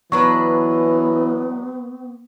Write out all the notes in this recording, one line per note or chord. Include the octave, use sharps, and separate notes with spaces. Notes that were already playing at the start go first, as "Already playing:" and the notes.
E3 F#3 B3 D4 B4 C#6